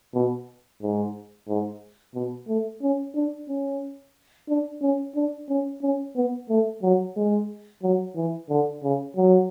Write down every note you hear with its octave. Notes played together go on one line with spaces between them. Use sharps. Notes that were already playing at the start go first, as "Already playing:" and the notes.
B2
G#2
G#2
B2
A3
C#4
D4
C#4
D4
C#4
D4
C#4
C#4
B3
A3
F#3
G#3
F#3
E3
D3
C#3
F#3